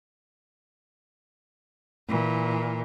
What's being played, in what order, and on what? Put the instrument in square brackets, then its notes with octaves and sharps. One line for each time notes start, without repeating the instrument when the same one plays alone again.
[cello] A#2 E3